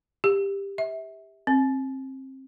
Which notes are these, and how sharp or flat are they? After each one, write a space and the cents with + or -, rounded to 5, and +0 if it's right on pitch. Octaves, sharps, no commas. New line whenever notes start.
G4 +15
E5 -25
C4 +25